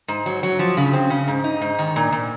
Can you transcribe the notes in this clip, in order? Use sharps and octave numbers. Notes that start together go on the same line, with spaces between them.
G#2
F#3
F#3
F3
C#3
C4
C#3
G#2
D#4
G#2
D#3
A#2
A#2